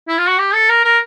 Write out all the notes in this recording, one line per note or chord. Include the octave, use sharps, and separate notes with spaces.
E4
F4
F#4
G4
A4
A#4
A#4